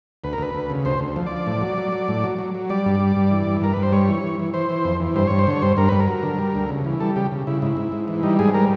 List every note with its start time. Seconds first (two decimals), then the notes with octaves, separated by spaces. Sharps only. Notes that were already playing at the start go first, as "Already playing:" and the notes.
0.24 D2 B4
0.33 A#4
0.38 D2 B4
0.55 D2
0.70 C#3
0.85 D2 C5
1.00 D2
1.16 F3
1.26 F3 D5
1.47 A2
1.61 F#3
1.78 F#3
1.92 F#3
2.08 A2
2.24 F#3
2.38 F#3
2.54 F#3
2.70 G3 D5
2.86 G2
3.00 G3
3.16 G2
3.31 E3
3.47 G2
3.61 G2 A#4
3.73 G2 B4
3.83 C5
3.92 G3 C#5
4.09 E3
4.23 E3
4.39 E3
4.54 E3 C5
4.70 E3
4.85 F2
5.00 E3
5.16 G2 C5
5.27 G2 C#5
5.39 C5
5.47 D3 C#5
5.62 G2 C5
5.77 G2 A#4
5.89 G2 B4
6.00 A#4
6.08 F#3
6.23 D3
6.39 G3
6.55 D2
6.69 C#3
6.85 E3
7.00 G3 A4
7.16 C#3 G4
7.32 C#3
7.47 C#3 E4
7.62 G#2 E4
7.77 G#2
7.92 G#2
8.08 E3
8.23 G3 D#4
8.39 G#2 G#4
8.54 G3 A#4